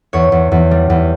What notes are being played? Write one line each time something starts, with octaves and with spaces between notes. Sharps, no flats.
E2 C#5
E2
E2
G3
E2